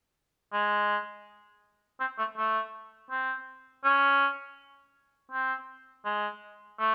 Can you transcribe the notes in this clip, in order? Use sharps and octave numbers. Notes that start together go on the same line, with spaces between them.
G#3
C4
A3
A3
C4
C#4
C4
G#3
A3